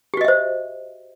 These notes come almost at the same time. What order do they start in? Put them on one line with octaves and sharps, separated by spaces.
G4 F#4 D#5 E5 C5